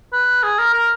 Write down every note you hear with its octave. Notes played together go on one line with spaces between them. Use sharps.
B4
G#4
A#4
A#4